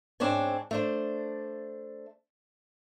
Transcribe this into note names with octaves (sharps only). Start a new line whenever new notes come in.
G#2 C4 D4 C#5 G#5
A3 D4 C5